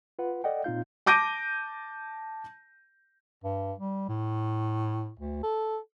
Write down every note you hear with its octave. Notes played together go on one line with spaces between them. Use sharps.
F4 B4 F#5
A4 D5 D#5 F#5 G5
A#2 C4 D#4 F4 F5 G6
A5 D6 G6 A#6 D7 D#7
G2
G3
A2
D2
A4